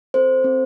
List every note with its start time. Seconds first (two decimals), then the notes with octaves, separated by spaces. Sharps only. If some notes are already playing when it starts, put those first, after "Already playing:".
0.14 C4 A4 C5
0.44 C4 A4